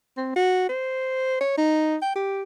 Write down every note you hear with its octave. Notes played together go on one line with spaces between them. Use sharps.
C4
F#4
C5
C#5
D#4
G5
G4